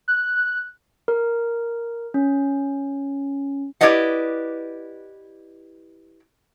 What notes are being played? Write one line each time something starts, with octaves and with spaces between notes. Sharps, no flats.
F#6
A#4
C#4
E4 G4 B4 D5 D#5 F#5